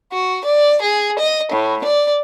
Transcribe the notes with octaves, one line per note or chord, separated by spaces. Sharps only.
F#4
D5
G#4
D#5
A2
D5